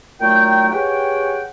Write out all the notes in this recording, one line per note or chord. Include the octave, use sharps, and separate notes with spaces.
A#2 F#3 A3 D#4 G5
G4 G#4 B4 C#5 F#5 G5